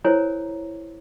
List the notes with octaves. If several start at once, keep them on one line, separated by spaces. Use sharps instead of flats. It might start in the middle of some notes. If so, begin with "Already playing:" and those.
E4 A#4 C5 C#5 G#5 A#5